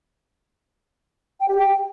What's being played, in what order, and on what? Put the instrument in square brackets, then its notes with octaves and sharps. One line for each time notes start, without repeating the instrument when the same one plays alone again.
[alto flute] G5
G4
G5